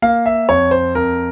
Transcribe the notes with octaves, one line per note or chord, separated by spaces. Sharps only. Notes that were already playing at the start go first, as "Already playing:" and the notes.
A#3 F5
E5
F2 C#5
C5
F2 A#4